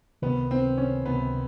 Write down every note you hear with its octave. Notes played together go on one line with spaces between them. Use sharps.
C#2 C3 D#3 B3
C4
C#4
C#2 C3 D#3 B3